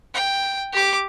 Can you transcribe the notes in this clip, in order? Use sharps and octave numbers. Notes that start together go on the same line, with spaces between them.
G5
G4 D6